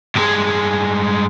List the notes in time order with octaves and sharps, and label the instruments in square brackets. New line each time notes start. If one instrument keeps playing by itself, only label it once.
[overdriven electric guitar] G2 G#3